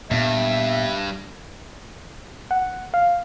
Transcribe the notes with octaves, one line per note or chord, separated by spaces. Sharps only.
G2 A#2 B3 E5
F#5
F5